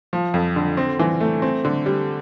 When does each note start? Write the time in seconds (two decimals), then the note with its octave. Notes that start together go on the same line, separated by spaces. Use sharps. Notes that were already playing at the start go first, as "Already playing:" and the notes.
0.13 F3
0.34 F2
0.56 D3
0.77 C4
0.99 E3
1.20 A3
1.42 C4
1.65 D3
1.86 G3